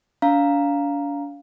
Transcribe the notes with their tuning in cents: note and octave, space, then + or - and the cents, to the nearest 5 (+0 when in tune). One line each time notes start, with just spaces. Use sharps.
D4 -40 F5 +0 A#5 +0